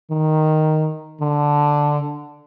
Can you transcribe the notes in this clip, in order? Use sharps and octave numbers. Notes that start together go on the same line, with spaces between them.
D#3
D3